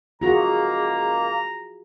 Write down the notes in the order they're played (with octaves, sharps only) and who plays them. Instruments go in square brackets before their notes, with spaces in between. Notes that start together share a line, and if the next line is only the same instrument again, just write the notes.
[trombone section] C#2 A#3 [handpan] F4 F#4 G#4 [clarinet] A#5